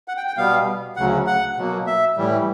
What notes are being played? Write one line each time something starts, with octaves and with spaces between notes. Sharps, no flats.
F#5
G5
G5
B2 G3 B3 F5
D2 C#3 F#3 F#5
F#5
B2 F#3 A#3
E5
A2 E3 G3